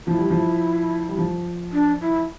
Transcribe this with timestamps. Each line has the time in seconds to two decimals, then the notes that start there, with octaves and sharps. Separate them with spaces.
0.07 F3 E4
0.18 G3
0.30 F3
1.09 G3
1.18 F3
1.73 D4
2.01 E4